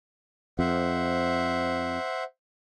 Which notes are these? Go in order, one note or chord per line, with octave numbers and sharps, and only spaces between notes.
F2 C5 E5 F#5